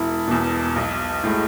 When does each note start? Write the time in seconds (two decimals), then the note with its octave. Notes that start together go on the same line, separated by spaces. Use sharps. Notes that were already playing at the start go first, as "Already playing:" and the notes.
Already playing: E1 E4
0.28 E2 B2
0.76 B1
1.23 A2 G#3